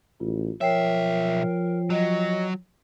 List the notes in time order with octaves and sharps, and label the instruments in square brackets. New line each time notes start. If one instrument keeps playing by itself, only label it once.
[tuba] A1 [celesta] F4
[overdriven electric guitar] B1 E5 [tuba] F3 [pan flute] A#4 [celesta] C#5 G5 C7
[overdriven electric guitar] F#3 [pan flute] D#5